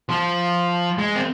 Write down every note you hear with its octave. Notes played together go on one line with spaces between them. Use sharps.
F3
G#3
C4